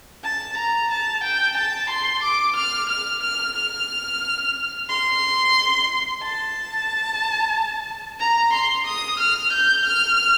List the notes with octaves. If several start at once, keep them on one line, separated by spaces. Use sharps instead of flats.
A5
A#5
A5
G5
A5
C6
D6
F6
F6
F6
F6
C6
A5
A#5
C6
D#6
F6
G6
F6